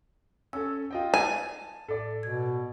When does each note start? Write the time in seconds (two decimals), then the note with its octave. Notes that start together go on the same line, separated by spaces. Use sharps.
0.53 C#4 A4 E6
0.91 F4 D#5 G5
1.14 G#5 A5
1.89 A2 A4 D5
2.23 B2 G#6